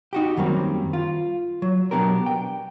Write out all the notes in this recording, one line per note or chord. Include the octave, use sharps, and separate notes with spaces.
D#4 F#4 G4
F#2 D#3 F#3 G3 A#3 C4
F4
F#3
B2 F#3 B3 D4 G4 A#4
G5